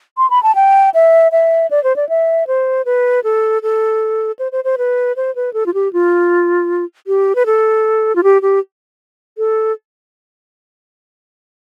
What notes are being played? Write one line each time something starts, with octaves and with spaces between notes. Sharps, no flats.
C6
B5
A5
G5
E5
E5
D5
C5
D5
E5
C5
B4
A4
A4
C5
C5
C5
B4
C5
B4
A4
F4
G4
F4
G4
B4
A4
F4
G4
G4
A4